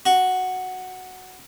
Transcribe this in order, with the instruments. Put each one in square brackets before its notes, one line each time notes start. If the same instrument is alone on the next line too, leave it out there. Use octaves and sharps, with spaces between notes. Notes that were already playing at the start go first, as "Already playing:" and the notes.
[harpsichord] F#4